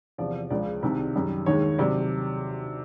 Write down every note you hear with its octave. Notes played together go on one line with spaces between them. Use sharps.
E2 C3 F3 D5
C#2 C#3 F3 G#3 D5
C2 C3 D#3
F#2 D#3 G3
D#2 D#3 G#3 C#5
C3 D#3 F#3 D5